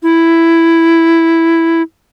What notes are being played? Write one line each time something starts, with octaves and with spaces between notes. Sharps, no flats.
E4